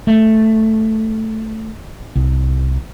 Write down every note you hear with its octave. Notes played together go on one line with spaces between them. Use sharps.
A3
C2